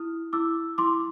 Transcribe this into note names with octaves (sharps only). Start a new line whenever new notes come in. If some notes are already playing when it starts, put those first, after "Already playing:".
Already playing: E4 D#6 F6
E4 D6 E6
E4 C6 D6